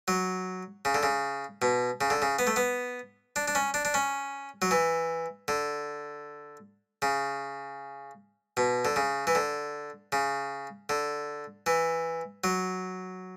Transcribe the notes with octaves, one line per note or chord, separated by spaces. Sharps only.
F#3
C#3
D3
C#3
B2
C#3
D3
C#3
B3
A3
B3
D4
D4
C#4
D4
D4
C#4
F#3
E3
D3
C#3
B2
D3
C#3
E3
D3
C#3
D3
E3
F#3